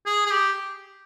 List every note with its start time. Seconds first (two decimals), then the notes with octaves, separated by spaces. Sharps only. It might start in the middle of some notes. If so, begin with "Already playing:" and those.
0.06 G#4
0.26 G#4
0.31 G4